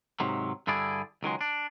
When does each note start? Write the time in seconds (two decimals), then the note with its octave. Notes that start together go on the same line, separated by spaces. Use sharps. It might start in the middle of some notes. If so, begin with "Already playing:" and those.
0.20 G#2 C3 D#3 F#3
0.67 G2 D3 E4 G#4 D5
1.23 C#2 D#3 F#3 G#3
1.41 D4